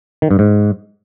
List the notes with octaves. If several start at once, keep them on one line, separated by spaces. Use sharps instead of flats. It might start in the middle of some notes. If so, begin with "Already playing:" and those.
D#3
G2
G#2